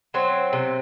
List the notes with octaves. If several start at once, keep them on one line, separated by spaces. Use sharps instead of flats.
F#3 C4
C3